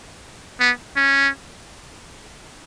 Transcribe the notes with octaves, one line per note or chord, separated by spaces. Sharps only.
B3
C#4